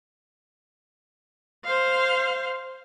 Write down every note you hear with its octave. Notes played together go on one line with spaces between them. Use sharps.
C5 F5